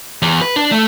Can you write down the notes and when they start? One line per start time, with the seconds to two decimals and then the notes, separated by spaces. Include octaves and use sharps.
0.22 E2
0.41 B4
0.56 D4
0.72 A3